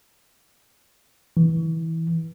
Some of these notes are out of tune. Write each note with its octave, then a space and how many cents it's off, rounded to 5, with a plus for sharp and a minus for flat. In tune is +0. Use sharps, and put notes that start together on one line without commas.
E3 -20